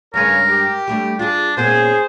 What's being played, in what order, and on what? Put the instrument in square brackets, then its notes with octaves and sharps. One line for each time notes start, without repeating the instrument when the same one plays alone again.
[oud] G2 G#3 B4 [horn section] C#3 C#5 [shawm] A#4
[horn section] G4
[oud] G3 A3 D4
[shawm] D4 [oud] F4 G#4
[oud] A#2 B3 C#4 [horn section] G#4 [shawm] C5